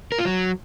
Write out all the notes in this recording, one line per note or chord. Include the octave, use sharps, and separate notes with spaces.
A#4
F4
F#3